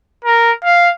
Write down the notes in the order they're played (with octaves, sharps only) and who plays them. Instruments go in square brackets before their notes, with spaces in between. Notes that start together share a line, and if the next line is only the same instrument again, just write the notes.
[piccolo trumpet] A#4
F5